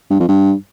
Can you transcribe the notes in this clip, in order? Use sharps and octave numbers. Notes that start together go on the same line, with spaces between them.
G2
F2
G2